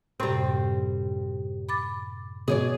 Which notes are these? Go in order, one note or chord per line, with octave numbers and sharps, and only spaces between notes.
F#2 A2 C3 G3 C4
B5 D6 A6
B2 G#4 C#5 D5